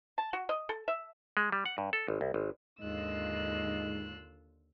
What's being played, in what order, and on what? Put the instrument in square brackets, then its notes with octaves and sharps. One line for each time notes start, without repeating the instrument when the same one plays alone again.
[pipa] A5
F#4
D#5
A4
E5
[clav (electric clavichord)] G#3
G3
F#5
G2
A4
G#1
C2
G#1
[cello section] D#2 D3 F4 [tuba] G#2 [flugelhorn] D#5 [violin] E6 F#6